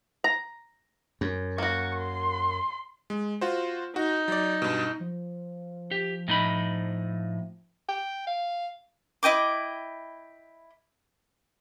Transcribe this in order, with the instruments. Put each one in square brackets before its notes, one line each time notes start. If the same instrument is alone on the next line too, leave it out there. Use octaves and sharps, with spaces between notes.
[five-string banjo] A#5
[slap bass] F#2
[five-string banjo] A#3 F#4 [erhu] C#6
[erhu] C6
[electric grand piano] G#3
F4 F#4 C5
[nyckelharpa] D#4 [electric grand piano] F#4
[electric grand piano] F#3 D5
G2 B2
[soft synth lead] F3
[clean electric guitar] G4
A2 D#4 B5
[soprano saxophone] G5
F5
[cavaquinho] E4 D#5 G5 D6